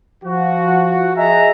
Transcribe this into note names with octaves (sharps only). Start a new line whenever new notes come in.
F3 F#4
G#4 D#5 E5 G#5 A#5